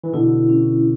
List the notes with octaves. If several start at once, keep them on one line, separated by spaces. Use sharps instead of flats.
E3
B2 D3 E4
C#4